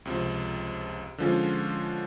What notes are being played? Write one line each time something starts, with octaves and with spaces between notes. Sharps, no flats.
C#2 C3 F3
D3 F3 G#3 C#4 F4